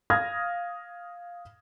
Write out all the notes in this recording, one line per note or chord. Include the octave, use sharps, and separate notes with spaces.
F5 D#6 F6 G#6 A#6